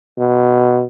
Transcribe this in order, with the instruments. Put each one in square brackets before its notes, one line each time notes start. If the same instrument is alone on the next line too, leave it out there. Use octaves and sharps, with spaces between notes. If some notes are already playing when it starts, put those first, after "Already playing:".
[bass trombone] B2